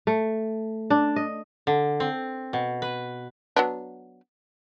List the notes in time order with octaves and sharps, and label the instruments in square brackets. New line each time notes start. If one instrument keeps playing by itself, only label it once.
[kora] A3
D4
D#5
[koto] D3
C4
B2
B4
[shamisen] F#3 B3 D4